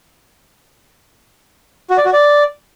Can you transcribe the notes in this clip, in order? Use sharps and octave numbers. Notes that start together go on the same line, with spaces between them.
F#4
D5
F#4
D5